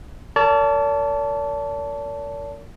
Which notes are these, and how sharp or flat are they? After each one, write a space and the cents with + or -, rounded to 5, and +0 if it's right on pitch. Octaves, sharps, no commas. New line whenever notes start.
A#4 -30 D5 -45 A5 +0